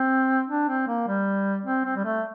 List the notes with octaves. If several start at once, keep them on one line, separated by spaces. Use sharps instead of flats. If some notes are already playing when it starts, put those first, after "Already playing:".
Already playing: C4
D4
C4
A#3
G3
C4
C4
G3
A3